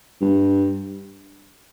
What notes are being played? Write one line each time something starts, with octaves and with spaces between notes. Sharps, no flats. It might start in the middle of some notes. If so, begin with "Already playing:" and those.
G2